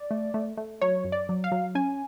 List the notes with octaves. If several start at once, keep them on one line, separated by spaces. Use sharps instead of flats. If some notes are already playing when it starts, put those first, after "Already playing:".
Already playing: D5
A3
A3
A3
F#3 C#5
F#2
D5
F#3
F5
F#3
C#4 G#5